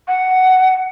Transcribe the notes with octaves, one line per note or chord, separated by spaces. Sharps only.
F#5